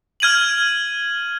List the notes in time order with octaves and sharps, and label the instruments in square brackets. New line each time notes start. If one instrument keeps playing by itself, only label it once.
[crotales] F6 G#6 D#7 F#7